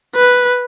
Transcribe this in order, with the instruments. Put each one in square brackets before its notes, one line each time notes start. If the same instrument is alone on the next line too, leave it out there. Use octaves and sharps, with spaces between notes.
[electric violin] B4